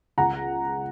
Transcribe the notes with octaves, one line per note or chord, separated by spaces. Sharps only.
C#2 F#5 A#5